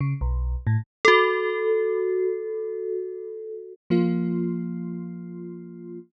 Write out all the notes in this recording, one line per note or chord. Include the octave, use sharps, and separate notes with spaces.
C#3
B1
A2
F#4 A4
F3 A#3 F4